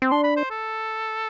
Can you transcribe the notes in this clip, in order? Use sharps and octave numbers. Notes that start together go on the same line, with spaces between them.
C4
D4 C6
B5
C5
A4